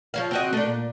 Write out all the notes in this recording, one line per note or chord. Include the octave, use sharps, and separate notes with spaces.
F3 C#5 F5
C4 F#4 D#5
A3 D4
A#2